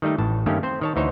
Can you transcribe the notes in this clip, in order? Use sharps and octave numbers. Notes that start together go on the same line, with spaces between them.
D#3 G3 A3 D#4
A1 A2 A5
G2 D#3 A3 A#3 C#4 G4
C4 C5
D#3 C#5 A5
D2 E3 D#4 C5 C#5